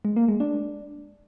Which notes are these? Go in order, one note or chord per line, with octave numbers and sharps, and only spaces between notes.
G#3
A#3
G#3
D4